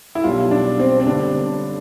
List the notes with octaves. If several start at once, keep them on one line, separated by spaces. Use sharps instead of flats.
E4
B1 B2 G3 F4
D4
C4
C4
G1 G2 D3 D4